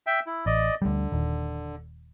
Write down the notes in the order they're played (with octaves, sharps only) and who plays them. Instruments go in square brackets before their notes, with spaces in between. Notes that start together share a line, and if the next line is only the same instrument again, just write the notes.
[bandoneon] E5 G5
E4
[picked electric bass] A1 [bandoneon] D5 D#5
[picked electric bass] D2 G3 [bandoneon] D3
[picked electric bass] D#1 D#2